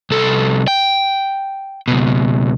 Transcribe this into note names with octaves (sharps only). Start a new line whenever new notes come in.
C2 A4
G5
C#2 B2